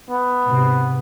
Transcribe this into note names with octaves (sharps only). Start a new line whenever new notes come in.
B3
G#2 C3